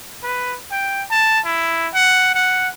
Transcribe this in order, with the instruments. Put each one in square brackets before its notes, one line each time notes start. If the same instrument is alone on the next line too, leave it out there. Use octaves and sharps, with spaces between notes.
[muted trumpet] B4
G5
A5
E4
F#5
F#5